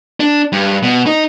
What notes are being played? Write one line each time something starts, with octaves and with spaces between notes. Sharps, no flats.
D4
G2
B2
D#4